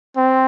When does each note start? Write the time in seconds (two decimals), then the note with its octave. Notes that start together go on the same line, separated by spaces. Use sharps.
0.17 C4